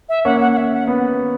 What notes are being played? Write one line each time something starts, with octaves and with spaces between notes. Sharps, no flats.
E5
A#3 C#4 F#5
F#5
F#5
E5
F#5
B3